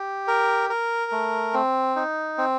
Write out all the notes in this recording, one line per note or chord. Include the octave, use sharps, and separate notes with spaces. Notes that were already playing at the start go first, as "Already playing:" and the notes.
Already playing: G4
A#4
A#4
A3
C4
D#4
C4